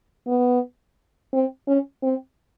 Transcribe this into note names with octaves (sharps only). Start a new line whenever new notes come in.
B3
C4
C#4
C4